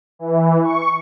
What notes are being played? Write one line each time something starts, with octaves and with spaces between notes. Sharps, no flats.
E3
C#6